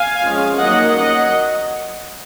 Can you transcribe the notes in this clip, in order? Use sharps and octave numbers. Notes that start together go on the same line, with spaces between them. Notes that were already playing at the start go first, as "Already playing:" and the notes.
Already playing: F5 G#5
F3 G#3 C#4
D#3 F#3 A#3 C#4 D#5 F#5
F#3 D#5 F#5